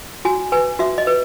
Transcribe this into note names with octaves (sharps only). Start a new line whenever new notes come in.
F#4 G#5
B4 G#5
F#4 E5
D#5
B4